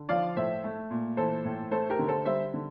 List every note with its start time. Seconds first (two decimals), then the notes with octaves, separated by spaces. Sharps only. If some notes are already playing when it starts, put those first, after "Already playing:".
Already playing: D3
0.09 F3 D5 F5
0.36 A2 C5 E5
0.64 A3
0.91 A#2
1.17 E3 A4 C5
1.45 A2
1.71 A3 A4 C5
1.90 G4 A#4
1.99 D3
2.08 A4 C5
2.25 G3 C5 E5
2.54 D3